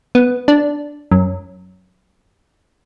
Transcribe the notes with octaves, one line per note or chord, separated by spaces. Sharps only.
B3
D4
F#2